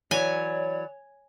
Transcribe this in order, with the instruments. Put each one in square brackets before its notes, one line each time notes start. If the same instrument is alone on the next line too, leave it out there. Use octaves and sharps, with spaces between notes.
[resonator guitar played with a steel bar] E3 F#3 [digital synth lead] C#5 [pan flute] D5 [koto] G#5